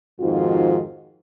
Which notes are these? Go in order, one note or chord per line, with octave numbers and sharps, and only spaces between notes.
F2 G#2 D#3 F3 F4 F#4